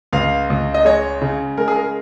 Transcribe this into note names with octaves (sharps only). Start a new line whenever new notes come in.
C#2 F5
C#2
D#5
G#3 C#5
C#3
G#3 A#4
G#4
A#4